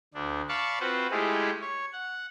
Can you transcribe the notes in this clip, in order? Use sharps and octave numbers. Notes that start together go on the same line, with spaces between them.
D2 D4
D5 F5 A5 B5 C#6
C4 F4 F#4 B4 C5
G#3 A3 E4 F4 G4 G#4
C#5
F#5